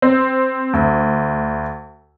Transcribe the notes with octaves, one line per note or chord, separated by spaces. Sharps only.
C4
D2